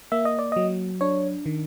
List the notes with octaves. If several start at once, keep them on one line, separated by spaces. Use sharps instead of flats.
A#3 E5
D#5
D5
F#3 D#5
D4 C#5
D#3